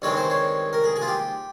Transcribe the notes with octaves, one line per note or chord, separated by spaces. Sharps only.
G2 D#3 G#3 C4 C#5
C5
C#5
A#4
G#4
G#4
F4
G4